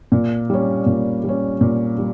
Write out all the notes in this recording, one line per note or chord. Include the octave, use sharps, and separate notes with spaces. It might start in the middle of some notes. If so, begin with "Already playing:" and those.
A#2
G3 C#4
A#2
G3 C#4
A#2
G3